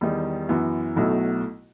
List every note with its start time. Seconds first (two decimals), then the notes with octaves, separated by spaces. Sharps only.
0.01 E2 D#3 G3 D#4
0.49 F#2 E3 B3
0.96 B1 B2 F#3 A3 E4